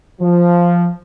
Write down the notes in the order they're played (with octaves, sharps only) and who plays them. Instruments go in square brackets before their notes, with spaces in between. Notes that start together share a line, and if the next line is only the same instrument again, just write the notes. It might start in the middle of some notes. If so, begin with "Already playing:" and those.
[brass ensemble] F3